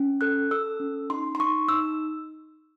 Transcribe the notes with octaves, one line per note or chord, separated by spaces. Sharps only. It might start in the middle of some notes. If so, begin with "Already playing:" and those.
Already playing: C#4
A4 F#6
A4 E6
C#4
D#4 C6
C6
D#4 C#6
D#4 E6